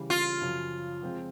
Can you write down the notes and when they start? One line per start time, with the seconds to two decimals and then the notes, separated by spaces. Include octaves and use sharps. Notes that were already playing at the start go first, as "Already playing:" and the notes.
Already playing: C#3 E3 G3
0.10 F4
0.41 F#2 C#3 F3
1.03 F3 G#3 C4